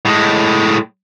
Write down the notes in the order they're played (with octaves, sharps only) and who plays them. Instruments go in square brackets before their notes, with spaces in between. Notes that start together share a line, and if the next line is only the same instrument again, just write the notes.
[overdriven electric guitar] A2 G#3